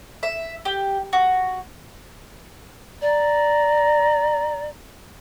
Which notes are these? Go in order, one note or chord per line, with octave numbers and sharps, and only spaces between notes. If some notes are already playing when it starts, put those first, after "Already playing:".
E5
G4
F#4
D5 A#5